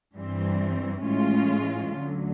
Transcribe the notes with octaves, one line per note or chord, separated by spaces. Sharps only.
G2 E3 G3 C4
A2 E3 G#3 C#4 F4
D2 D3 F#3